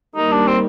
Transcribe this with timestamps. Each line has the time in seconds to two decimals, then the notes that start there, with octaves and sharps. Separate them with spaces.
0.16 D#3 G3 A#3 D#4
0.31 D4
0.47 C4